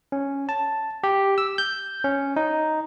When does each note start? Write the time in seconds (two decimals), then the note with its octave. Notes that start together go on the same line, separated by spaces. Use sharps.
0.12 C#4
0.49 A5
1.04 G4
1.38 E6
1.58 G6
2.04 C#4
2.36 D#4